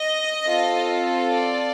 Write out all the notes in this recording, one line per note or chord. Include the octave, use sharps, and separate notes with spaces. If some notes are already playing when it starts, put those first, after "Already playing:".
Already playing: D#5
C4 F4 A4
D5